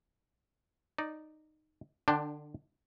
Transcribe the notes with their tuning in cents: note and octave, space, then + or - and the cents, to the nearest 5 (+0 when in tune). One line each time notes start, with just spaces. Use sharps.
D#4 -10 D5 +0
D3 +25 D4 +0 G5 +0